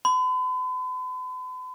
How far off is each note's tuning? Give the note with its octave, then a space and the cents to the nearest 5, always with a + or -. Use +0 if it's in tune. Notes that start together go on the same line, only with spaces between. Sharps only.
B5 +45